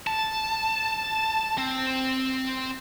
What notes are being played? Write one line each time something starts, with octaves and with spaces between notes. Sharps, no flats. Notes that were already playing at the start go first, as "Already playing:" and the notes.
A5
C4